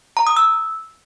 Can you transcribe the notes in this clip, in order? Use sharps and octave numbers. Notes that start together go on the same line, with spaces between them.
A#5
D#6
E6